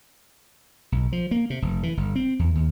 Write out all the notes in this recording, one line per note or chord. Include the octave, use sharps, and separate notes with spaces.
B1
F3
A#3
C3
F1
E3
G1
C4
E2
D#2